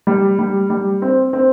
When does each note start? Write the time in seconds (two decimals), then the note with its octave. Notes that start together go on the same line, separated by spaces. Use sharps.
0.07 G3
0.39 G3
0.70 G3
1.02 C4
1.33 C4